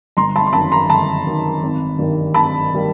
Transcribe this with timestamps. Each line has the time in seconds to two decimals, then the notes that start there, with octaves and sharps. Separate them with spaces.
0.17 G1 A#5 C6
0.36 A5 B5
0.47 C6
0.53 F#2 D#3 A5 B5
0.72 A#5 C6
0.89 G1 A5 B5
1.26 F#2 D#3
1.63 G#1
1.99 G2 D#3 G3 A#3
2.34 G#1 A5 B5
2.73 D#3 G3 A#3